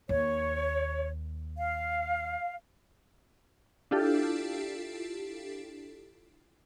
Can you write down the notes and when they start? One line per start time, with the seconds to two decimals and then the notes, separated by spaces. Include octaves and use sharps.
0.09 D#2 C#5
1.57 F5
3.91 D4 E4 F4 G4 A4